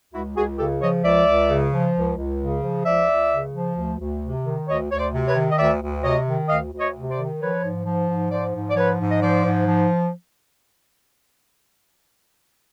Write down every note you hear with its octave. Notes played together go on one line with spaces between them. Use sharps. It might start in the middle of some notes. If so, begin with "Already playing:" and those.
C#2 E4 F#4
C#2 F#4 G#4
C#3 G4 A4
F3 C#5 D#5
C#2 D5 E5
C#2
C#3
F3
C#2
C#2
C#3
F3
C#2 D5 E5
C#2
C#3
F3
D2
D2
C3
D#3
D2 C#5 D#5
D2 C#5
C5 D5
C3
B4 C#5
D#3
D#5
D2 D5 E5
D2
C3 C#5 D#5
D#3
D2 D#5 F5
D2
C#5 D#5
C3
C5 D5
D#3
F3 B4 C#5
G#2
F3
G#2
F3 C5 D5
G#2
D5
F3 B4 C#5
G#2
D#5
F3 C5 D5
G#2
F3